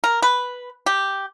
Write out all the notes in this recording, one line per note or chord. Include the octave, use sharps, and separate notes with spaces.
A#4
B4
G4